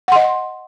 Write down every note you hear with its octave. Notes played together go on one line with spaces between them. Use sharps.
D#5 F#5 C6